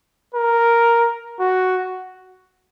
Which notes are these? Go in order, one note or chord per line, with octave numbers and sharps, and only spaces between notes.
A#4
F#4